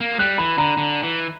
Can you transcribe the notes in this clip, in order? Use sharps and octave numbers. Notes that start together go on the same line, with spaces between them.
A#3
G3 F#6
E3 B5
D3 A#5
D3
E3